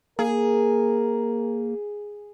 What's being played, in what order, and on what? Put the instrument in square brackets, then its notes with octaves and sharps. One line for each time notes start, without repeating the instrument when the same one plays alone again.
[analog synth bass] A#3 [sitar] G#4 [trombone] A#4